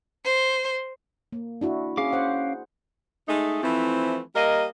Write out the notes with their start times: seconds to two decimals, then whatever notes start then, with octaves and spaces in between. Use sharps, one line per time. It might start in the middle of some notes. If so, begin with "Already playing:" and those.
0.25 C5
1.32 A#3
1.61 D4 E4 F#4
1.98 C#4 G#4 F5 D6
2.13 C5 F#5
3.28 G#3 A3 D#4
3.63 E3 F3 A3 C4 E4
4.35 G3 A#3 A#4 D#5